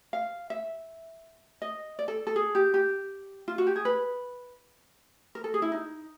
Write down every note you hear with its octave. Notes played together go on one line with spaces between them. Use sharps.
F5
E5
D#5
D5
A4
A4
G#4
G4
G4
F4
F#4
G4
G#4
B4
A#4
A4
G#4
E4
D#4